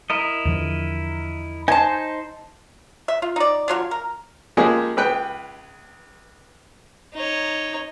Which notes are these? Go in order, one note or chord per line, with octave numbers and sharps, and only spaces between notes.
E4 A#4 D#5
E2 D3 F3
D#4 C5 G#5 A5
E5
F4
D#4 D5
D3 F#3 F4 C#5
A#4
F3 G#3 A#3 C#4 G4 G#4
C#2 G#4 B4 G5 F#6
D#4 C#5